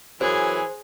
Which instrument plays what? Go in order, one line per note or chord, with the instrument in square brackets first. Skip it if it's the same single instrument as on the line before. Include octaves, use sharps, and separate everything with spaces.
[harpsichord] F#2 [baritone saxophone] E3 [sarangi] G#4 [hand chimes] C5